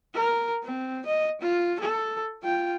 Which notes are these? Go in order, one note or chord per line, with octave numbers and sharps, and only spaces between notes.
A#4
C4
D#5
F4
A4
F4 G5